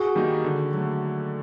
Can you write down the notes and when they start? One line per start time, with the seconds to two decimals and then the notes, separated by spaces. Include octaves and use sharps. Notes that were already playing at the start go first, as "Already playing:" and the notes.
Already playing: F#4 G#4
0.15 D#3 G3 A#3 D#4
0.44 D3
0.73 F#3 A3